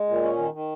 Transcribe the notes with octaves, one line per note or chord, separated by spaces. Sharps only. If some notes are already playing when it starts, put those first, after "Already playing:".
Already playing: G#3
A#2
C#4
D#3
D#3